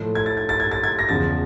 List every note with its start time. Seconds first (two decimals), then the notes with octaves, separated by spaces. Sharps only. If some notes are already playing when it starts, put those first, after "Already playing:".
Already playing: A2 F3 A3
0.15 G#6
0.26 A6
0.37 G#6
0.49 A6
0.60 G#6
0.71 A6
0.84 G#6
0.99 A#6
1.09 E2 C#3 F3 A6